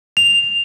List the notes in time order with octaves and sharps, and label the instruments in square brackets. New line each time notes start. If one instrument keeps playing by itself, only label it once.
[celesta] F7